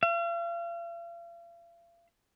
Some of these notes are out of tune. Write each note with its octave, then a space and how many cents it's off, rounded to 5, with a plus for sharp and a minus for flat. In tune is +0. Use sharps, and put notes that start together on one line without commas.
F5 -40